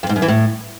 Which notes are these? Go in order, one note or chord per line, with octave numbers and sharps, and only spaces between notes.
F2
G#2
F#2
E3
A2